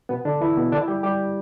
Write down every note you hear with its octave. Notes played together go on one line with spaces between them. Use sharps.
B2 B3
D3 D4
E3 E4
B2 B3
D3 D4
E4
G3 G4
G3 G4